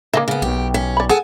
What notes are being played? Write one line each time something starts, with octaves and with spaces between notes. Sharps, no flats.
C#3 A#3 D#5 E5
C#3 B3
B1 G4
C#4 E5
D5 B5
G#4 A4 F#5 G#5